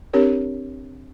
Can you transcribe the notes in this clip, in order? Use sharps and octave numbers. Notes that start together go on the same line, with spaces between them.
C4 D4 G4 A#4 C#5